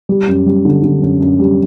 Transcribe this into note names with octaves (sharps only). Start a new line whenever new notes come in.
G3
F#2
G3
D3
D3
F#2
F#2
G3